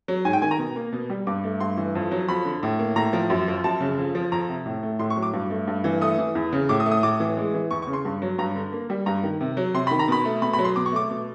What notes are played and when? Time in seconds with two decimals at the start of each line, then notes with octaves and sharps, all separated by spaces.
0.08 F#3
0.25 G#2 G#5
0.33 G5
0.42 D#3 G#5
0.51 A#5
0.58 B2
0.76 A#3
0.93 B2
1.10 G3
1.27 G2 D6
1.44 A3
1.60 G2 C6
1.77 E3
1.95 F2
2.11 F#3
2.28 F2 B5
2.45 D3
2.63 A2
2.79 A#3
2.96 A2 A#5
3.13 F3
3.30 F#2
3.48 F3
3.64 F#2 A5
3.80 C#3
3.98 F2
4.15 F3
4.32 F2 A#5
4.49 C3
4.66 A2
4.83 A3
4.99 A2 C6
5.10 C#6
5.16 F#3
5.23 D6
5.33 G2
5.50 A3
5.67 G2
5.84 E3
6.01 A3 D#6
6.18 E3
6.35 E2
6.53 C#3
6.69 A2 D6
6.80 D#6
6.86 A3
6.92 D#6
7.03 A2 D6
7.20 E3
7.37 G#3
7.54 E3
7.71 E2 C#6
7.82 C#6
7.87 C#3
7.93 C6
8.05 G2
8.22 F#3
8.38 G2 A#5
8.56 D3
8.73 A#3
8.90 G3
9.06 G2 A#5
9.23 D#3
9.41 C3
9.57 F#3
9.74 C3 C6
9.87 D#3 B5
9.99 A#5
10.08 B2 B5
10.25 A3
10.42 B2 B5
10.53 B5
10.59 F#3
10.64 C6
10.76 B2 D6
10.86 C#6
10.93 A3 D6
11.10 B2